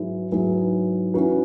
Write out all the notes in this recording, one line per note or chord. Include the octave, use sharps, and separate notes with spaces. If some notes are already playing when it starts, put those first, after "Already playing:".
Already playing: G#2 F#3 E4 G#4 B4
G#2 F#3 E4 G#4 B4
E3 C#4 F#4 B4